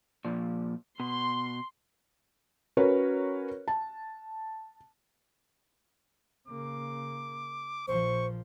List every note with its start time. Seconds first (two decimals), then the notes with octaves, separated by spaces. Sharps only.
0.25 A#2 F3
1.00 B2 C6
2.77 C#4 F#4 A#4 B4 C#5
3.68 A5
6.48 C#3 A#3 D6
7.88 A#1 F3 C5 C#6